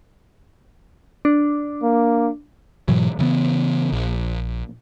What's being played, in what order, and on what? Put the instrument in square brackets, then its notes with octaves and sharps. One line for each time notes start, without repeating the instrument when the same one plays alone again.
[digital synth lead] D4
[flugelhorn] A#3
[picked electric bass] G#2 B2 E3 F#3
C#3 E3 A#3 B3
A#1